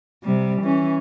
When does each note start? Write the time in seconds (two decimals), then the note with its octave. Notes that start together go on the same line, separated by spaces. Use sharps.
0.23 C3 G3
0.62 E3 C#4